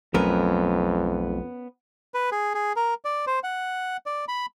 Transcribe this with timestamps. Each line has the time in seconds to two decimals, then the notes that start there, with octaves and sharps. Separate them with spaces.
0.14 B1 F2 F#3 A3 B3 C#4 A#4
2.14 B4
2.32 G#4
2.55 G#4
2.76 A#4
3.05 D5
3.27 C5
3.44 F#5
4.06 D5
4.28 B5